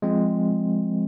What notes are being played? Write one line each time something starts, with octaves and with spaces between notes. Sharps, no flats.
F3 G#3 C4